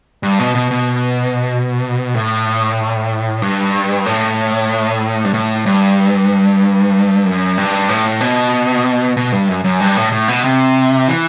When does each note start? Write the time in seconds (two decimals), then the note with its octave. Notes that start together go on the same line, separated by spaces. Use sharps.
0.23 G2
0.39 B2
0.55 B2
0.71 B2
2.15 A2
3.42 G2
4.06 A2
5.25 G2
5.34 A2
5.66 G2
7.26 F#2
7.58 G2
7.89 A2
8.21 B2
9.17 B2
9.32 G2
9.48 F#2
9.64 F#2
9.80 G2
9.97 A2
10.12 A2
10.28 B2
10.44 C3
11.08 E3